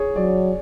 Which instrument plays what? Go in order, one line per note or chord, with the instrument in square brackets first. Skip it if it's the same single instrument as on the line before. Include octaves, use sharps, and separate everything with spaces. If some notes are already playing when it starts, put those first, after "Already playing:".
Already playing: [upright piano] G#4 C#5
[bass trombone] F#3 [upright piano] D5